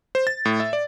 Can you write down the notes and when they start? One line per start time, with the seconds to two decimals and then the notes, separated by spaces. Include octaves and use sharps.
0.15 C5
0.27 A6
0.45 A2
0.60 E5
0.73 D5